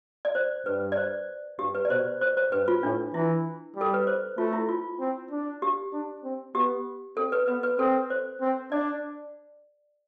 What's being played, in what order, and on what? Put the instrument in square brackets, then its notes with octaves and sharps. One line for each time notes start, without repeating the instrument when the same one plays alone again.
[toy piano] D5
C5
[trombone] G2 [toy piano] B4
[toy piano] D5
C5
[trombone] G2 [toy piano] G4
[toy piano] B4
D5
[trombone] B2 [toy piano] C5
[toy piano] C5
C5
[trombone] G2 [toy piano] B4
[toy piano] F4
[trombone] A2 [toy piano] D4
[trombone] E3 [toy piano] E4
[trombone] G3
[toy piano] A4
B4
C5
[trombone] A3 [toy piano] F4
[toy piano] E4
F4
[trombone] C4
D4
[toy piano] G4
[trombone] D4
C4
[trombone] B3 [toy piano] G4
[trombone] C4 [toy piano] A4
[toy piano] B4
[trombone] B3 [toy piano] B4
[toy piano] B4
[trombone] C4 [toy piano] A4
[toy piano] C5
[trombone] C4
[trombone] D4 [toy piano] D5